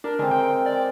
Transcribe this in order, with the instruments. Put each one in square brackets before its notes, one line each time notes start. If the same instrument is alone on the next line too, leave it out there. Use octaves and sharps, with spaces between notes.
[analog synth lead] D4 [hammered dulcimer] A#4
[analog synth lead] D3 [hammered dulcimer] G#3 C4
[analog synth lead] G5
D5